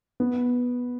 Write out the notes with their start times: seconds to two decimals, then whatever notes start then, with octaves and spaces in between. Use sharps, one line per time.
0.20 B3